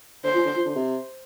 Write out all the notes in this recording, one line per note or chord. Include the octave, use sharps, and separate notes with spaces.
D3 C5
F3
D3
F3
D3
C3